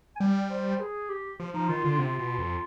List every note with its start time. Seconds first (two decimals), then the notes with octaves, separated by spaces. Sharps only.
0.16 G#5
0.20 G3 G5
0.50 C5
0.80 G#4
1.10 G4
1.40 F3
1.54 F3 D#4
1.69 D#3 F4
1.84 D3 F4
1.98 C3 F4
2.19 B2
2.38 F2